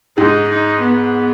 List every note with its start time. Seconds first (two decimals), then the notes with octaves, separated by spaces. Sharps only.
0.17 G#2 G#3 D#4
0.49 D#4
0.81 B3